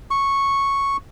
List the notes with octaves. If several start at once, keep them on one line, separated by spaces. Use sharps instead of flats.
C#6